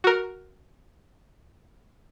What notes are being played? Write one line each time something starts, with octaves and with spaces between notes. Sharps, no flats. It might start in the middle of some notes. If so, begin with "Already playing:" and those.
F#4 A#4